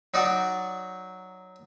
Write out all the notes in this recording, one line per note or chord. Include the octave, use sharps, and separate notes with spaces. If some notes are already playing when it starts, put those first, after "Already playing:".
F#3 D#4 F#4 D5